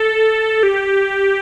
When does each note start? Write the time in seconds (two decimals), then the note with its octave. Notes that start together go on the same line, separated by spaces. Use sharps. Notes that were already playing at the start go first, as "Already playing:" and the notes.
Already playing: A4
0.63 G4